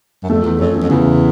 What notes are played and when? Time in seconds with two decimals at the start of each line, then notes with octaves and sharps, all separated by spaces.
0.23 F#2
0.29 F2 A3
0.44 E2
0.59 F2 C#4
0.75 E2
0.82 F2
0.90 E2 C#3